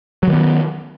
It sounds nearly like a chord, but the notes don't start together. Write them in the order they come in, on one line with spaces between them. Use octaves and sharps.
F#3 D#3 B3